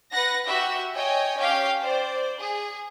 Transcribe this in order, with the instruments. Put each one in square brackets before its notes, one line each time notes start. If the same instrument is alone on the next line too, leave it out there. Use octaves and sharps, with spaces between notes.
[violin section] B4 F#5 A#6
F#4 G4 E5
C#5 D#5 G5 G#5
C#4 G4 F5 G5
C5 D5
G#4